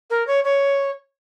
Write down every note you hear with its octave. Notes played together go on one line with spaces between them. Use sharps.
A#4
C#5
C#5